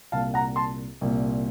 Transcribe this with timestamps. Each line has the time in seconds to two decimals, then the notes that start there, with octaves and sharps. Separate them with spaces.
0.12 C2 A#2 F5 A5
0.34 F#5 A#5
0.56 A5 C6
1.01 C2 A#2